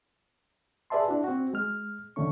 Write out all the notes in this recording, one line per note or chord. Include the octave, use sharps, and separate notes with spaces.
G#4 B4 D5 E5 A5 C6
D4 E4 F#4
C4 F#4
G#3 F6
F2 D3 D#3 A3 C#4 C#6